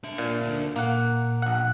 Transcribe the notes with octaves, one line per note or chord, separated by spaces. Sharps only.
D4 E5
A#2
D2 D4
A#2 A#3 F#5
A#1 F#5